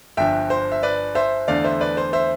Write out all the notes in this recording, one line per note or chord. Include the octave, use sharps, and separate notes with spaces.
G1 G2 F3 E5 G5
C5
E5
B4 D5
C5 E5
E2 D3 A3 D5 F5
C5 E5
B4 D5
C5
C5 E5